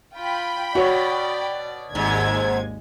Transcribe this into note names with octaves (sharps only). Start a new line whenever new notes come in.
F4 G5 B5
B2 F#4 C#5 D5 C#6
G#1 D#2 G#2 C3 G#3 G#6